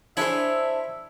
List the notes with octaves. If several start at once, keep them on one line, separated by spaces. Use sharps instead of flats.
D4 E4 G#4 C5 C#5 E5